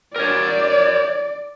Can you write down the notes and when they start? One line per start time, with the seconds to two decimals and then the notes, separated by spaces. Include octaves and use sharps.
0.16 A#4 C#5 D5